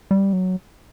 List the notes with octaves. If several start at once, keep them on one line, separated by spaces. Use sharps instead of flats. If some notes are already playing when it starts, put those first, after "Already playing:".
G3
F#3